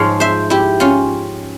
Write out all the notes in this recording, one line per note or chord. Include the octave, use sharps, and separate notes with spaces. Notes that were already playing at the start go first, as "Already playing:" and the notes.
Already playing: G#2 F3 G#3 C#5 F5
C5 E5
E4 G4
C#4 F4